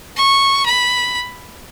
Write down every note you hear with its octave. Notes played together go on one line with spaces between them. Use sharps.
C#6
B5